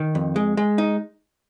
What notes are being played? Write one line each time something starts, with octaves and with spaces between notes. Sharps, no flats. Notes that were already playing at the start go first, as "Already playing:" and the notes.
Already playing: D#3
F2
G#3
G#3
D#4